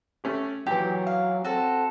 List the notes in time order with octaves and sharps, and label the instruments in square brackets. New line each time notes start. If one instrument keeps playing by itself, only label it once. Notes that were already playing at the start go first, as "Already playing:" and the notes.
[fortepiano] A3 C#4 G4
[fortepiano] A#2 E3 [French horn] F#3 [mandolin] G4
[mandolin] F5
[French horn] C4 [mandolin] F#4 A4